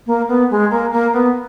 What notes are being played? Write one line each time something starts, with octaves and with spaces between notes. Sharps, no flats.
A#3
B3
G#3
A#3
A#3
B3